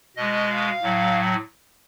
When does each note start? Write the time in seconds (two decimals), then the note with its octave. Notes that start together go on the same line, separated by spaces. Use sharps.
0.16 B2 G#3 D#5
0.50 F5
0.82 A2 F#3